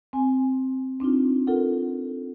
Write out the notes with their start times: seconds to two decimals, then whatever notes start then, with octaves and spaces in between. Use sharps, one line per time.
0.13 C4 G#5
1.00 C4 D4 D#4 F4
1.47 F4 A4 A#4 F#5